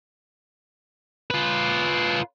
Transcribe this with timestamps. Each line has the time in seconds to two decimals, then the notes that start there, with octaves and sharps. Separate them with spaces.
1.31 F4 B4